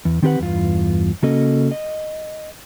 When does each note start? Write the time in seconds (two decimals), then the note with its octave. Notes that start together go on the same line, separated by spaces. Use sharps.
0.05 E2
0.22 D#3 C4 G4 B4 F#5
0.39 E2 G2 F4
1.22 C#3 A#3 C#4 F#4 A4 D#5
1.71 D#5